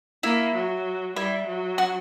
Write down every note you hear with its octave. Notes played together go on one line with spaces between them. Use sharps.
A#3 E4
F#3
G3 E4
F#3
F#4